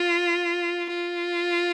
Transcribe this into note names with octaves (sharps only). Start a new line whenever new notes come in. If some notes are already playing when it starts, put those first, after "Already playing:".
Already playing: F4
F4